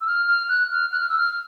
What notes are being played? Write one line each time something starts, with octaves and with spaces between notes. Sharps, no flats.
E6
F6
F6
F#6
F6
F#6
F6
E6
F6